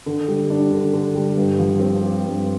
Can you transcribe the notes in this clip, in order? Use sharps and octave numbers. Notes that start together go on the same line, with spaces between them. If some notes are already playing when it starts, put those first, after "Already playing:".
D3
G3
D4
D3
D3
G3
G2
F3
C4
G4
G2